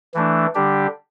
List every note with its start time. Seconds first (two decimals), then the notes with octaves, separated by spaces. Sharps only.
0.14 E3 A3 D4
0.55 D3 G3 D4 G4